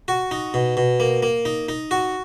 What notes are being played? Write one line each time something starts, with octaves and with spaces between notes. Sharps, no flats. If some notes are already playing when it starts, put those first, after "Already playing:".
F#4
D#4
B2
B2
A#3
A#3
D#4
D#4
F#4